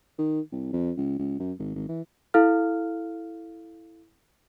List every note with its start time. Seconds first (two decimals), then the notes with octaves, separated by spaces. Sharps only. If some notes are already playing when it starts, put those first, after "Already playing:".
0.18 D#3
0.52 C2
0.73 F2
0.97 C#2
1.19 C#2
1.40 F#2
1.59 G#1
1.75 G#1
1.89 E3
2.34 E4 A4 F5 F6